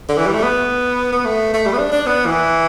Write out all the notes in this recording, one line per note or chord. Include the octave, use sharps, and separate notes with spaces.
D3
E3
G3
A3
B3
B3
A3
A3
G3
B3
D4
D4
B3
E3